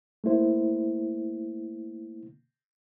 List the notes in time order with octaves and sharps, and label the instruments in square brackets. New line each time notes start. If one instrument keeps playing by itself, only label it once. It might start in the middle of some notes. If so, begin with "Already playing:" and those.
[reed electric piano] A3 A#3 E4 C5